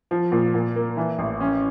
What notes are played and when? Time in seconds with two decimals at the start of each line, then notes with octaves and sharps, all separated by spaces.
0.11 F3
0.32 A#2
0.54 A#2
0.76 A#3
0.97 E3
1.19 A1
1.41 C#4